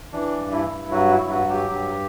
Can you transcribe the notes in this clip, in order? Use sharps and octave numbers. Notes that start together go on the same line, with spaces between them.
E3 D4
G2
E4
G2
F#3 F#4
E4
G2
F#4
F#3
G4
G2 G4